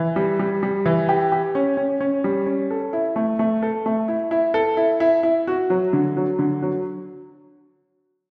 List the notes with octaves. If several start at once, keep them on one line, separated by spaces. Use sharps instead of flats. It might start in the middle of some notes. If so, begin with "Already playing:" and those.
Already playing: E3
G3
G3
G3
E3
G4
G4
C#4
C#4
C#4
G3
C#4
A4
E4
A3
A3
A4
A3
E4
E4
A4
E4
E4
E4
F#4
F#3
D3
F#3
D3
F#3